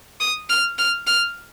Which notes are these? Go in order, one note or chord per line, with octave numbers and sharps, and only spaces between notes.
D#6
F6
F6
F6